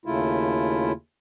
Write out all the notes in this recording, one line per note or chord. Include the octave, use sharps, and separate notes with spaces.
D#2 C#3 A3 E4 F4